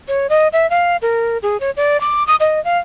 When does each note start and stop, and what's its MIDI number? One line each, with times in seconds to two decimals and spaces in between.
0.08 0.27 73
0.29 0.48 75
0.53 0.69 76
0.70 0.97 77
1.02 1.38 70
1.42 1.60 68
1.60 1.70 73
1.77 2.00 74
2.00 2.26 86
2.27 2.35 87
2.40 2.63 75
2.65 2.78 77